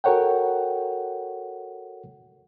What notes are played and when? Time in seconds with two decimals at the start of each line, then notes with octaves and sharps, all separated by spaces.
0.04 F#4 A4 A#4 C#5 F#5 G5